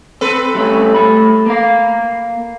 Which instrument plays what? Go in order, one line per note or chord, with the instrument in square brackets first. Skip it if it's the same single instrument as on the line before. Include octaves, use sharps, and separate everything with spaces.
[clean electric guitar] C4 [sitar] A4 B4
[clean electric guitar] G3 A3 C#4
A3 B5
A#3 F5